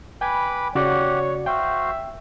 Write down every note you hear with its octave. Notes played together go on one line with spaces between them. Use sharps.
B4 G5 G#5 B5 D6
C#3 F#4 G4 C#5 D5 F#5
F#4 C5 E5 F5 G5